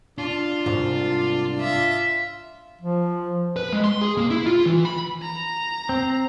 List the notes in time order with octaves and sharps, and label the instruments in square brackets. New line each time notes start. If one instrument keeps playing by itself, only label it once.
[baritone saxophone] D4 [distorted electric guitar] F4
[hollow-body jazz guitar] C2 G#2
[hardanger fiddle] F4 E5
[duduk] F3
[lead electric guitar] B4
G#3
C6
G#4
A#3
E4
F4
E3
B5
[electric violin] A#5
[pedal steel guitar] C4